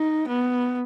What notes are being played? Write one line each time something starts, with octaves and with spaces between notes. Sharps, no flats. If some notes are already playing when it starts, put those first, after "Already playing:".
Already playing: D#4
B3